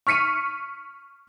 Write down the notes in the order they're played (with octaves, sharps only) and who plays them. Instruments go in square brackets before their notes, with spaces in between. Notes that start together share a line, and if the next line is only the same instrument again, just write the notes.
[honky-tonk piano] C#6 F6 B6 C#7 D#7